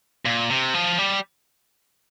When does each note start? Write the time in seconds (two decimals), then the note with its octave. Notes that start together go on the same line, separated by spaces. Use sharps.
0.25 A#2
0.50 C3
0.74 F3
0.99 G3